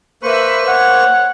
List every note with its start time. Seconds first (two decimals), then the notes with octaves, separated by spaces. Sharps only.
0.23 A#3 B4 C5 E5 C#6
0.68 C#5 F#5